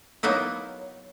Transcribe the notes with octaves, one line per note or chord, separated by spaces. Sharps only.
F#3 A#3 B3 D#4 E4